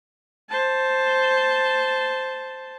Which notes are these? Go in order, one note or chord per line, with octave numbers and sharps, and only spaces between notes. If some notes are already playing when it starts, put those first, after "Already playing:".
C5 A5